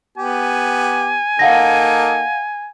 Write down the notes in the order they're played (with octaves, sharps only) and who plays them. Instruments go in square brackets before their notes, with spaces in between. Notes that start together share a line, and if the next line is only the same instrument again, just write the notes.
[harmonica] B3 G4 [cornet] G#5
[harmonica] A#3 D#4 A4 [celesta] F5 F#5 A#6